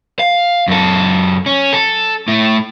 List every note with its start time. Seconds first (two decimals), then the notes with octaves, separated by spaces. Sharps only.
0.19 F5
0.68 F#2 A4
1.46 C#4
1.73 A4
2.28 A2 A3